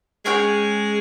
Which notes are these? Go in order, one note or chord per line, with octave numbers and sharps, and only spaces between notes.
G#3 C#4 G#4 C#5 G5